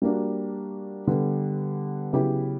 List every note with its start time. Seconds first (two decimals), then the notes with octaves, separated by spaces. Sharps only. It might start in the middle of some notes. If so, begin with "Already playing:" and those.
0.02 G3 A#3 D4 F#4
1.07 D3 G3 B3
2.13 C#3 F#3 B3 E4 G4